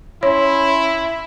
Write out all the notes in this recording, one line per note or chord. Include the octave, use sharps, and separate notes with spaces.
C#4 E4 C#5 B5 C6